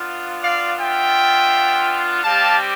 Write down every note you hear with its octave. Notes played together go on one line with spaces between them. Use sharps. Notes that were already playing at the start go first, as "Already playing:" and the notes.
Already playing: B3 D4 F4
D5 F5
E5 G5
G3 C4 G4 F5 A5